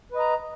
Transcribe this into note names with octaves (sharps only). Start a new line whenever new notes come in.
B4 D#5 A#5